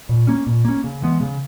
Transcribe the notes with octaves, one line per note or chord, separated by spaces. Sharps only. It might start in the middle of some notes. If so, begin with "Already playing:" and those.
A#2
A#3 C#4
A#2
A#3 C#4
C#3
E3 G#3 B3
C#3